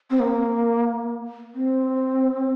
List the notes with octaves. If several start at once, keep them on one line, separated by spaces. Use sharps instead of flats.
C4
A#3
C4